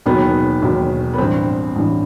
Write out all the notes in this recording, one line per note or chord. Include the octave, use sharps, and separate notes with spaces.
E1 D#2 D#3 F#3 B3
E1 D#2 D#3 F#3
B3
A1 G2 E3 C4
A1 G2 E3